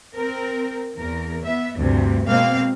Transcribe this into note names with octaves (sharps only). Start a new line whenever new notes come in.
C4 A#4
E2 A#4
B3 E5
D2 G2 C3
B2 G#3 A#3 C4 F5